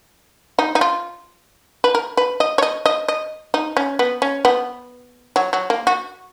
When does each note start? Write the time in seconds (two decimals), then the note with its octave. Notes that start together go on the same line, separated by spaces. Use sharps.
0.59 D#4
0.75 D#4
0.81 F4
1.84 B4
1.95 A#4
2.17 B4
2.40 D#5
2.58 C#5
2.62 D#5
2.86 D#5
3.08 D#5
3.54 D#4
3.77 C#4
3.99 B3
4.22 C#4
4.45 B3
5.36 F#3
5.53 F#3
5.70 A#3
5.87 F#4